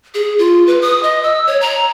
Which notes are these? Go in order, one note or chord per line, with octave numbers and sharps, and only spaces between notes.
G#4
F4
B4
D#6
D#5
E6
C#5
A#5